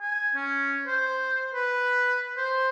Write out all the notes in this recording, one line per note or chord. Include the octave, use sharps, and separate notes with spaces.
G#5
C#4
C5
B4
C5